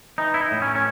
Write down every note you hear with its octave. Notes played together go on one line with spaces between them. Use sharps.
E3 D#4
E4
D#4
A2
C#4
C#4